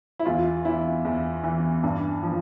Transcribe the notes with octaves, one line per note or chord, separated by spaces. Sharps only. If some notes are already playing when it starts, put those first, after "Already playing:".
E4
E2 F4
E3 E4
E2
E3
G2
F3